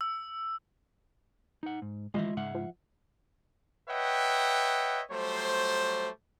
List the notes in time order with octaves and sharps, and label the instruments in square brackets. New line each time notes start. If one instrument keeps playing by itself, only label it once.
[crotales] E6
[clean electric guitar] D#4 F#5
G#2
[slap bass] A1 D#3 E3 [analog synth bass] G#3 [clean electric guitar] F4 D#5 E5
[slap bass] G#2 C#3 [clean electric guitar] E5 F#5
[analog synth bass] F3
[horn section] B4 C#5 D#5 E5 F#5 G5
F#3 G3 A3 C5